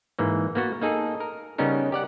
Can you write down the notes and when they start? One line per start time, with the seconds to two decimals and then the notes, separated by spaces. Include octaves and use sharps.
0.19 G#2 E3 A#3
0.55 A#3 B3 F#4
0.81 A#3 D#4 G#4 A4
1.20 A#4
1.58 C#3 G3 B3 C#4 D#4 A#4
1.92 G4 D5 F#5